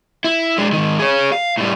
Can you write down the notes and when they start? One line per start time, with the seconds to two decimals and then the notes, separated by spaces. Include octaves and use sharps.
0.24 E4
0.58 G#3 D4
0.73 G#2 D#3
0.99 G#4 C#5
1.32 F5
1.58 A2 G3